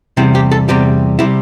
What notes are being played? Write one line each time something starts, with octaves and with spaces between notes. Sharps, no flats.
E2 C3 G3 E4
G4
A4
E2 C3 G3 G4
C3 G3 E4